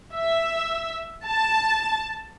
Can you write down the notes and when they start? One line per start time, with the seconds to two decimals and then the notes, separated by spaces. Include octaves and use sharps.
0.14 E5
1.26 A5